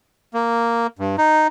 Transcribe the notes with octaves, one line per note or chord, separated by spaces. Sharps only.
A#3
G2
D#4